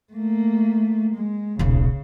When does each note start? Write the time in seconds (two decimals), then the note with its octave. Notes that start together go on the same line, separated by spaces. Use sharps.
0.14 A3 A#3
1.15 G#3
1.59 D#1 B1 C#3